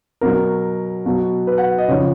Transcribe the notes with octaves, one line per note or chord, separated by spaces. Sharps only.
B2 F#3 A#4
B2 F#3
B4
F#5
D#5
C#3 F3 C#5